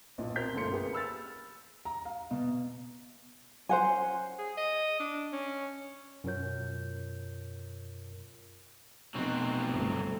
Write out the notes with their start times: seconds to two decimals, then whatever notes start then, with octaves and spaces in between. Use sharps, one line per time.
0.18 B1 A#2
0.36 C4 A#4 F6 G6 B6
0.55 G1 F#2 A3 A#3 C6 C#7
0.72 A#3 G4 G#4 B4
0.93 B5 E6 F6 A6
1.85 A#5
2.05 F5
2.31 B2
3.69 C#4 C5 F#5 G#5
4.38 G#4
4.58 D#5
5.00 D4
5.33 C#4
6.24 F#2 B2 F4 A#4 C#5 G6
9.15 F1 B2 F#3 C4 F#6
9.69 G1 C2 A3